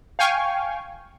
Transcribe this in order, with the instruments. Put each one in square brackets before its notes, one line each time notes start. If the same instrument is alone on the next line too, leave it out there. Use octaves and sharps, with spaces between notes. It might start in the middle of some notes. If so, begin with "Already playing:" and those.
[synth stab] F5 G5 G#5 C#6